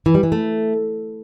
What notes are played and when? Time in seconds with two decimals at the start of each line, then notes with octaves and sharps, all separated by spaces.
0.06 E3
0.15 G3
0.23 E3
0.32 A3